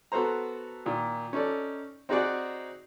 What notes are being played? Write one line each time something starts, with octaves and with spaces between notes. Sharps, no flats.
B3 F#4 A4 C5 A#5
A#2 D#3
C#4 D#4 A4 D5
C4 D#4 F#4 G#4 D5 F#5